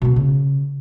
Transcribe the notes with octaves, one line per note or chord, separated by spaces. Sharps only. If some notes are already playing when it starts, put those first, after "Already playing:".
B2 A#3
C#3